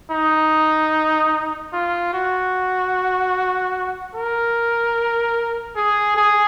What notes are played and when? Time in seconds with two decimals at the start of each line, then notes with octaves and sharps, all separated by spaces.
0.11 D#4
1.73 F4
2.13 F#4
4.15 A#4
5.76 G#4
6.17 G#4